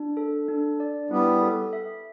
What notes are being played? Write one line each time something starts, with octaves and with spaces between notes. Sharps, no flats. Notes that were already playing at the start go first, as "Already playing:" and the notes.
Already playing: D4
A4
D4
D5
G3 B3 E4
A4
E5